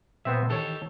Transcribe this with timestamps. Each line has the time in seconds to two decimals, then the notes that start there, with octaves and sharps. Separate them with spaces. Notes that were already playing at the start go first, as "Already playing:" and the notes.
0.25 A#2 B3 C4 E5
0.50 D#3 E3 G4 A4 C#5